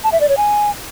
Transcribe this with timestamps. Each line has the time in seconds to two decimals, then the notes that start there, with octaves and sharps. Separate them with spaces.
0.04 A5
0.12 E5
0.21 D5
0.29 C#5
0.37 G#5